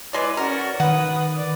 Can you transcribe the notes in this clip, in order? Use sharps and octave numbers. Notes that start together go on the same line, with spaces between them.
E3 G#3 B4 D5 D6
C#4 F#4 A#4 D5
D#3 B4 F#5 D#6
D5 D6